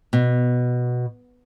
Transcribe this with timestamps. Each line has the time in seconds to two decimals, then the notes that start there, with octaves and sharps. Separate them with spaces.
0.13 B2